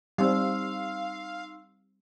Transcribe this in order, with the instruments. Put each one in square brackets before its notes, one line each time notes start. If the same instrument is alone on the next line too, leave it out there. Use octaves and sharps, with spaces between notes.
[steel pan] G3 C4 [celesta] D#4 C6 E6 [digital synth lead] F5